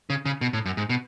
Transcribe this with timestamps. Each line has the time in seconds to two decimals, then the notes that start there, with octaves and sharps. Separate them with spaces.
0.10 C#3
0.26 C#3
0.41 B2
0.53 A2
0.66 F#2
0.77 G#2
0.90 B2